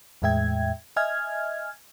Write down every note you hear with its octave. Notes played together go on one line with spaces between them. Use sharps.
E2 A2 G#3 E5 G5 G#6
D#5 E5 G#5 F6 G#6